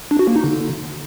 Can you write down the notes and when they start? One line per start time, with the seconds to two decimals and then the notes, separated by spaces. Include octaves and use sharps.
0.11 D4
0.19 F#4
0.28 A#3
0.36 D#4
0.44 D3